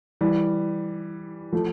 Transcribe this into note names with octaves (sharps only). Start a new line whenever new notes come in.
E3 G3
F3 A3